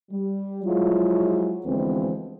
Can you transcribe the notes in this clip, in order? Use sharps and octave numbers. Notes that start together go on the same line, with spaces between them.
G3
F3 F#3 G#3 E4 F4
D2 E3 F3 G#3 B3 C4